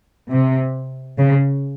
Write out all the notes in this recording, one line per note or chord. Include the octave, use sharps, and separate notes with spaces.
C3
C#3